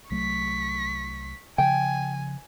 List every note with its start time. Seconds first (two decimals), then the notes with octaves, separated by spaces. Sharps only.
0.11 C2 F#3 A3 C#6 B6
1.58 C#3 F3 G5 G#5